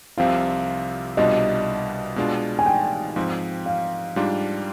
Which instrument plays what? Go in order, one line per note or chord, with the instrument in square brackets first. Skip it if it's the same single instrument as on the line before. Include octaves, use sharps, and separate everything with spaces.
[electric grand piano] C2 C3 F3 C4 F4 [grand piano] F5
[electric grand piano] C2 B2 G3 D4 F4 [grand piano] D#5
[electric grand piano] B2 G#3 D4 F4
[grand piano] G#5
G5
[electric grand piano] G#2 F3 C4
[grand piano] F5
[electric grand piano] G#2 G3 D4 F4